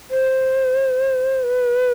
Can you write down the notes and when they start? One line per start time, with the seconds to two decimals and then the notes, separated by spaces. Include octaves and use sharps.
0.11 C5
1.44 B4